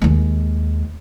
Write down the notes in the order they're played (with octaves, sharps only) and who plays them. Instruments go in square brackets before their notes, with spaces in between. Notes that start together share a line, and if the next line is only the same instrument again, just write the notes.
[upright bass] D#2 G#3